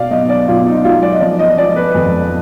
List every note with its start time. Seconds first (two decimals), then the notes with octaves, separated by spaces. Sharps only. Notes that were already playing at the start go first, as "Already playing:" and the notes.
Already playing: B2 D5 F5
0.11 B1 D#5
0.29 D5
0.48 B1 F4
0.66 D#4
0.84 F#3 F4
1.02 D5
1.12 D#5
1.20 F3 D5
1.39 D#5
1.57 F3 D5
1.76 B4
1.95 F2